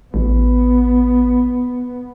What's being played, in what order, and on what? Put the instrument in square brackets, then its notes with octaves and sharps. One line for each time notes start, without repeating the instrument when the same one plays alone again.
[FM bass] A1 [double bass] B3